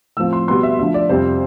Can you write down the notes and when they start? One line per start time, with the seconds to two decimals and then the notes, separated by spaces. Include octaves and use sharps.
0.17 A2 F3 C4 E6
0.33 C6
0.48 B2 G3 B3 C6
0.63 E5
0.78 D2 D3 F3 E5
0.94 D5
1.09 F2 C3 G3 C4 C5